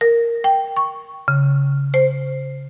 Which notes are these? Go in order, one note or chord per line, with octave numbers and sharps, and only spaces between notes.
A#4
G5
C#6
C#3
C5